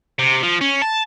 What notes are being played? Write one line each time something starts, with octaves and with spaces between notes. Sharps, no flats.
C3
F3
C#4
A5